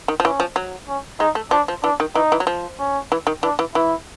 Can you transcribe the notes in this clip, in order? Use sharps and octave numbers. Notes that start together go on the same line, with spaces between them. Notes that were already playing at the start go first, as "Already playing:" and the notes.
D#3
F3
E3 C#4
F3
F#3
C#4
G#3 D#4
A3
F3 D4
F3
E3 D4
D#3
E3 D#4
E3
F#3
F3
C#4
E3
D#3
E3 D4
E3
E3 E4